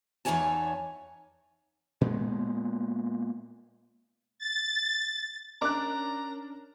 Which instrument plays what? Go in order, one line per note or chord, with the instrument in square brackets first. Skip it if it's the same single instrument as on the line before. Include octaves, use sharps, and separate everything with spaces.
[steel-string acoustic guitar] E2 E3 D#4 C#5 G#5 A5
[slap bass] A#2 G#3 B3
[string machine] A6
[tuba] C#4 [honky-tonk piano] D4 A#4 [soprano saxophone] A#5 [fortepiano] D6 F#6